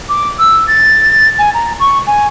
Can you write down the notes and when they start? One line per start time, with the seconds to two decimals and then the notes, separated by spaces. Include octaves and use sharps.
0.09 D6
0.39 E6
0.67 A6
1.39 G#5
1.54 A#5
1.80 C#6
2.07 G#5